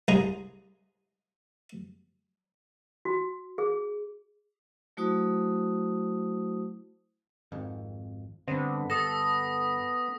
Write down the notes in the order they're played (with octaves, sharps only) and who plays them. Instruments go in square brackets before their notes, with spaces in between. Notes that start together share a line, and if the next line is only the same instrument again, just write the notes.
[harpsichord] C2 G#3 G#4 A#5
[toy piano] F#4
G#4
[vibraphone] F#3 A3 E4 F#4 C5 D#6
[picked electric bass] G#1 F2
[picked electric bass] G2 C4 [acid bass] D3 [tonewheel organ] B3
[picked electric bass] G1 [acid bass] A4 [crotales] D#6 A#6